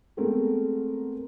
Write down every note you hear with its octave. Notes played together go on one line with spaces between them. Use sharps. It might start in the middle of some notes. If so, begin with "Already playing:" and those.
G#3 A3 B3 C4 A#4